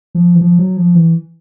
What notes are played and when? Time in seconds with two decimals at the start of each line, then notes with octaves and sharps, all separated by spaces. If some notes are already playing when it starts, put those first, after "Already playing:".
0.15 F3
0.35 E3
0.41 F3
0.59 F#3
0.77 F3
0.95 E3